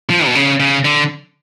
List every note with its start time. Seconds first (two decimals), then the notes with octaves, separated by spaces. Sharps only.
0.10 F3
0.26 B2
0.35 C#3
0.60 C#3
0.85 D3